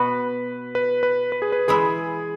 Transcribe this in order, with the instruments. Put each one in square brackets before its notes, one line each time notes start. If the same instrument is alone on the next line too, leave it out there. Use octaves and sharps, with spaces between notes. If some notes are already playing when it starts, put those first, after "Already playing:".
Already playing: [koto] B2 B3 F#4 [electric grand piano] B4
[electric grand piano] B4
B4
B4
G#4
B4
[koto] E3 G#3 E4 [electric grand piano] G#4